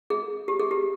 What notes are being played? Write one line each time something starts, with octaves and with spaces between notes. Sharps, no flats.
G#4
G4
G#4
G4